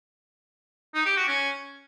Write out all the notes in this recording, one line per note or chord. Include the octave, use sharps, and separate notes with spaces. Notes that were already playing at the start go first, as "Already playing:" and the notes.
D#4
G4
F#4
C#4